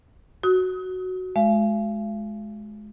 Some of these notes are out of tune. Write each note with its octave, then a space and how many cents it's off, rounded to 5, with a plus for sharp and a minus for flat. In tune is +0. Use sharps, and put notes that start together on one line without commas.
F#4 +0 D#6 +35
G#3 +30 F5 -40